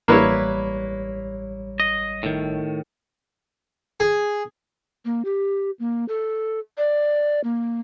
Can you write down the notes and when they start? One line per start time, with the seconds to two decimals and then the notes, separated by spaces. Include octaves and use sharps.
0.08 A1 G3 A#3 E4 B4 C#5
1.80 D#5
2.23 A2 D#3
4.00 G#4
5.05 A#3
5.25 G4
5.80 A#3
6.09 A4
6.78 D5
7.44 A#3